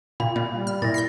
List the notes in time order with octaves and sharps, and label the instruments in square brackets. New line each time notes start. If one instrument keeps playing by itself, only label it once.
[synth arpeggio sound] A#2 [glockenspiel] B5
[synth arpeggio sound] A#2
[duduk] G3
[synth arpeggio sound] F6
[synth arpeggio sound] A#2 [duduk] E4 [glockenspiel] A6 A#6
[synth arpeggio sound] G6 B6 C7